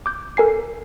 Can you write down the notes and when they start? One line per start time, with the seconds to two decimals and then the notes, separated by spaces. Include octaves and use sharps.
0.06 D6 G6
0.37 A4 A#4 G#5 C7